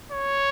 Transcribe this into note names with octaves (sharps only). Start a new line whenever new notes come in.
C#5